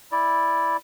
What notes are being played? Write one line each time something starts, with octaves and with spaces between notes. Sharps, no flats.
E4 D5